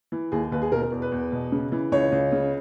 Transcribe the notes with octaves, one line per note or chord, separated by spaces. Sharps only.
E3
D#2 G#4
D#2 B4
G#4
B2 A#4
A#4
E2
B4
E2
B2
C#3
E3
C#2 C#5
C#2
C#3